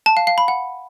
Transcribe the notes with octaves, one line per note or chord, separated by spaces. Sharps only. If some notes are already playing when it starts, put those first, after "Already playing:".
A5
F5
F5
B5
F#5